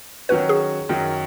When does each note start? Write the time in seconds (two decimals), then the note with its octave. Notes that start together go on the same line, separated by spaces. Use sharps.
0.29 D#3 F#3 C#4 F#4 B4
0.49 G#4
0.89 F#2 D#3 F#3